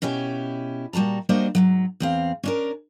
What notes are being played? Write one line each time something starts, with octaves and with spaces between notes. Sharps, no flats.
B2 C#4 E4 G4
A#2 G3 F#4 A5 A#5
G3 A#3 D4 F#4 C5 D#5
G#2 B2 F#3
E2 C4 F5
C#4 D4 A#4